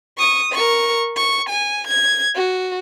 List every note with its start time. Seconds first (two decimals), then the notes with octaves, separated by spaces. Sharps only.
0.18 C#6 D#6
0.52 A#4 C#6
1.16 C#6
1.49 G#5
1.87 G#6
2.36 F#4